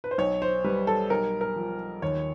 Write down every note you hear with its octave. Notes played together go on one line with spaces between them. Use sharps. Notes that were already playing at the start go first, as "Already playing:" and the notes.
B4
C5
B1 C#5
C5
G3 B4
A4
B1 A#4
A#4
F3
D#2 C#5